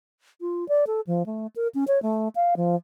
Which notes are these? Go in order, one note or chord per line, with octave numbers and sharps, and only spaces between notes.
F4
D5
A4
F3
A3
A#4
C#4
C#5
A3
F5
F3